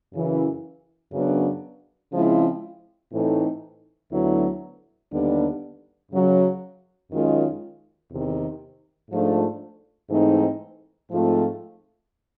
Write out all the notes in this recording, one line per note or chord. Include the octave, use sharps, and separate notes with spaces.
F#2 C#3 E3
F#2 C#3 F#3 B3 D4
C#3 F3 G#3 C4 E4
A2 E3 A3 C4 D#4
D2 D3 F#3 B3 E4
D#2 D3 G3 B3 D4
F#2 C#3 F#3
F#2 D#3 G#3 C#4 F4
E2 C3 D#3
G#2 F3 A3 D4 F4
G#2 E3 A3 C4 D#4
G#2 F3 A3 C4 F4